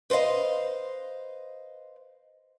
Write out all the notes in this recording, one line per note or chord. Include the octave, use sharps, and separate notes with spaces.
B4 C5 D5 D#5 F5